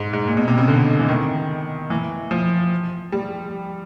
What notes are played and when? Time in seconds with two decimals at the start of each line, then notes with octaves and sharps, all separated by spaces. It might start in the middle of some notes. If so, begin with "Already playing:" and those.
Already playing: G#2
0.13 G#2
0.27 A#2
0.37 B2
0.48 C3
0.58 C#3
0.68 D3
0.99 E3
1.09 D#3
1.90 E3
2.31 F3
3.12 G3